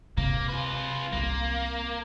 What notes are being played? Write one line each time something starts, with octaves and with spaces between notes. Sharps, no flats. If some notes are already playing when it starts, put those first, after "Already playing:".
C3 A#3
F4 B4
C2 A#3 C4